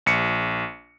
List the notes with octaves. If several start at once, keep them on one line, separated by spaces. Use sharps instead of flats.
A#1 C#7